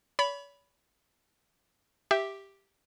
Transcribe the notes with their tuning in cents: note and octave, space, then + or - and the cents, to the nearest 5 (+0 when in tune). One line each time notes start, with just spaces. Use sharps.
C#5 +40 B5 +0
G4 +0 E5 +0